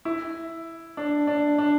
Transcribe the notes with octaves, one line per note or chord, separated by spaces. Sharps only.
E4
D4
D4
D4